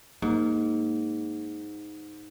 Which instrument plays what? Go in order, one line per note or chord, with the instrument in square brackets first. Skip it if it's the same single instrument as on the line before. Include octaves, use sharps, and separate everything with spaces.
[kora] G#2 [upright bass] A#3